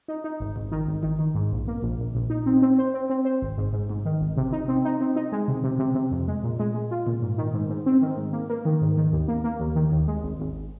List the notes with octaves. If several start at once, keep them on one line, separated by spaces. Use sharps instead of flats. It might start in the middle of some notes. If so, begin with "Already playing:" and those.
D#4
D#4
G#1
G#1
D#3
G#1
D#3
D#3
G#2
A#1
A#3
A#1
A#1
A#1
D#4
C4
C4
C5
C4
C4
C5
G#1
G#2
G#2
G#2
D#3
G#1
C3
D#4
C4
D#4
C4
D#4
G#3
C3
C3
C3
C3
F2
G#3
A#2
G#3
G#3
F4
A#2
G#2
D#3
G#2
G#2
C4
D#3
G#2
A#3
A#3
D#3
G#2
D#3
D#2
A#3
A#3
D#2
D#3
D#2
G#3
G#1
G#1